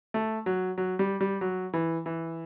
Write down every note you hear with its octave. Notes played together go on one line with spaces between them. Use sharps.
A3
F#3
F#3
G3
G3
F#3
E3
E3